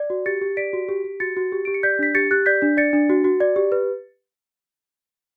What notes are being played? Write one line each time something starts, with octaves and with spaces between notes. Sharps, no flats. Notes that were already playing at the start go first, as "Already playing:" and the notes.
Already playing: D5
F#4
G4 A6 C#7
G4
D5 B6 D7
F#4
G4
G4
F#4 A6 C#7
F#4
G4
G4 D7
C#7
D5 G6 B6
D4 B6
G4 A6 C#7
G4 F#6 A6
D5 G6 B6
D4
D5 A6 C#7
D4
F#4
F#4
D5
G4
B4